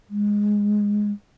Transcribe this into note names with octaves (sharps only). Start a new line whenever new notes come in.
G#3